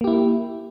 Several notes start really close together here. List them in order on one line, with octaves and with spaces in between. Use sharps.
A#3 G4 E4